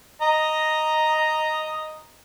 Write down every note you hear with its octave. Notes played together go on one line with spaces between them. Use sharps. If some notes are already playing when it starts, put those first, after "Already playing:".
D#5 A#5